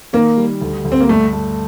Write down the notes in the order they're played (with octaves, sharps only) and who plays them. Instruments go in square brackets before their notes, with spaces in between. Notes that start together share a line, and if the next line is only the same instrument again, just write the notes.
[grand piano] D#3 [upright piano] A#3
[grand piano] G3
D2
D2
[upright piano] C4
A#3
[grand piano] G2 [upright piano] A3
[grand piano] A3